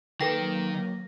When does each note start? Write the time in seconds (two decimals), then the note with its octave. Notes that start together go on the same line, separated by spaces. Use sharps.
0.21 D#3 F#3 A#3 A4 B4 G5 A#6